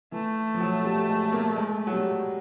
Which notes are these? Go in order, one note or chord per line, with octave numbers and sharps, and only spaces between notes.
E3 A3
F3
F#3
G3
G#3
A#3
G#3
F#3
G3